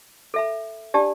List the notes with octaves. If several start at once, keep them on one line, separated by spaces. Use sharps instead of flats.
A4 E5 B5
D4 G4 D5 A5